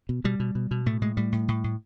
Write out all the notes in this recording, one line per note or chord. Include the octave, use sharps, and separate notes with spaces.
B2
B2 G3
B2
B2
B2
A2 A3
A2 G#3
A2 G3
A2
A2
A2